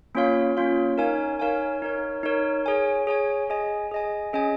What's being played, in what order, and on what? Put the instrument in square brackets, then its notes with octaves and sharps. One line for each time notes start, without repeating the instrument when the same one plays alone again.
[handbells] A#3 C#4 F4 C#5 F5
A#3 C#4 F4 C#5 F5
D#4 A#4 C#5 F5 G#5
D#4 A#4 C#5 F5 G#5
D#4 A#4 C#5
D#4 A#4 C#5
G#4 C#5 G#5
G#4 C#5 G#5
G#4 D#5 G#5
G#4 D#5 G#5
C#4 G#4 D#5 G#5